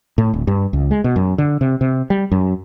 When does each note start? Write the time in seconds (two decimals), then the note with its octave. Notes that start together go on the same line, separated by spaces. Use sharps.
0.18 A2
0.34 D1
0.47 G2
0.73 C#2
0.91 G#3
1.04 B2
1.16 F#2
1.38 D3
1.61 C3
1.81 C3
2.10 G3
2.32 F#2